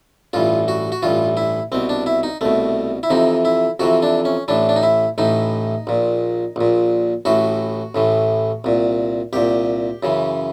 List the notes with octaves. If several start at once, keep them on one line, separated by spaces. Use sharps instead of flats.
A1 G2 E3 F4
F#4
F#4
A1 G2 E3 F4
E4
C2 B2 C4
D4
E4
D#4
C2 B2 A3
E4
F2 C3 E3 D#4
E4
F2 C3 E3 F#4
D4
C#4
A1 A2 E3 D4
D4
D#4
E4
A1 A2 E3 D#4
A#1 A#2
A#1 A#2
A1 A2 E3 F#4
A1 A2 E3
C2 A#2
C2 A#2 G4
F#2 C#3 E3